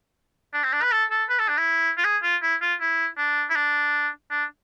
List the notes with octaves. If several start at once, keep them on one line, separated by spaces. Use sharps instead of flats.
D4
C4
D4
B4
A4
A4
B4
A4
D4
E4
F4
G#4
F4
E4
F4
E4
D4
E4
D4
D4